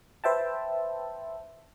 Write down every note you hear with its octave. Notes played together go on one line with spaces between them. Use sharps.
B4 C5 E5 G5 A5